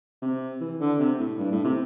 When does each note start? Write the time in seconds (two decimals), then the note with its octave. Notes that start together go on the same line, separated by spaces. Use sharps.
0.22 C3
0.60 E3
0.80 D3
0.99 C3
1.19 A2
1.38 G2
1.52 A2
1.64 C3